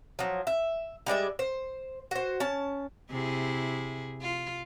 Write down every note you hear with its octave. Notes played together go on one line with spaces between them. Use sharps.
F3 F#3
E5
G3 G#3 D5 E5
C5
F#4 C5
C#4 A5
C3 E4 G#4
F4